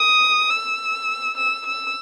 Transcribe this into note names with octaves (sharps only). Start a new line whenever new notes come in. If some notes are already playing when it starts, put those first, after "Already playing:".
Already playing: D#6
E6
E6
E6